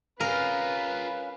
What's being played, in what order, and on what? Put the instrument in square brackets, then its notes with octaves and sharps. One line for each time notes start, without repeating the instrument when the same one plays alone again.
[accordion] C#4 F5 [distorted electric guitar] F4 G#4 [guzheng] A#4 [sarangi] B4